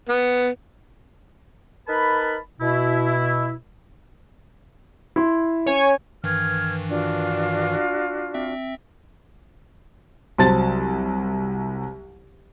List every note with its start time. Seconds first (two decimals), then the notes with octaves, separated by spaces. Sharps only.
0.09 B3
1.88 D#4 A#4 B4 A5 B5
2.60 B2 E4
5.16 E4 C6
5.66 C#4 C#5 G#5
6.24 G2 D#3 E3 F6 G#6
6.89 D4 F4 F#4
8.34 C4 E5
10.38 C2 F#3 C5 A5 A6